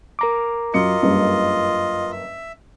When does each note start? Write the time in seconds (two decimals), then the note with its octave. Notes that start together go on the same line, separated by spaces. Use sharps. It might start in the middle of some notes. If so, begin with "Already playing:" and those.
0.19 A#4 A#5 D6
0.74 F#2 F4 D#5 C#7
1.02 F#1 G2
2.11 E5